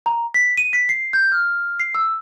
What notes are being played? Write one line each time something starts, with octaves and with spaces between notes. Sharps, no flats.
A#5
B6
D#7
B6
C7
G6
F6
C7
E6